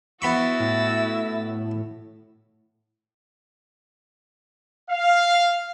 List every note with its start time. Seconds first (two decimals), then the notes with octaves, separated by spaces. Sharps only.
0.22 B3 E4 F#4 B5 C#6 E6 A6
0.60 A2
4.90 F5